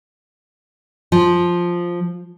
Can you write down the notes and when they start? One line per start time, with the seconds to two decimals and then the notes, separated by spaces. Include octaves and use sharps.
1.12 F3